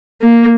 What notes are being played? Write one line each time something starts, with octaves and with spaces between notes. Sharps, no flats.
A#3